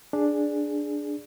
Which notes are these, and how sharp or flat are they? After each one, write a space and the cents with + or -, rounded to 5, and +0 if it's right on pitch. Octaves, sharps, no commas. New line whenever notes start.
D4 +0 G#4 +0